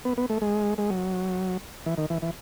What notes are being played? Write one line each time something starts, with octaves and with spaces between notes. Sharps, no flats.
B3
B3
A3
G#3
G#3
F#3
E3
D#3
E3
E3